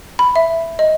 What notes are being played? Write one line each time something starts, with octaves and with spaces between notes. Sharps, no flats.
B5
E5
D#5